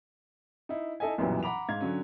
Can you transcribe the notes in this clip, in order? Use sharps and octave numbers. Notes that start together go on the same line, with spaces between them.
D#4 E4
D#4 E4 A4 D#5 E5 G#5
B1 F#2 A#2 E3 F#3 G3
F#5 A#5 B5 D6 F7
G#2 F5 G#6
D3 F#3 C#4